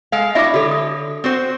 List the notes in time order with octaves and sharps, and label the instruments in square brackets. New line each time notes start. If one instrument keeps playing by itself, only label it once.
[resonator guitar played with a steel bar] G#3 A4 F5
[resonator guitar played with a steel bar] D4 E4 F#4 [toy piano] E5 D6
[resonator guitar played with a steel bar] D3 C#5 [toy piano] F#4 A4
[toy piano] D#6
[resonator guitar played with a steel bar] C4 F#4 C5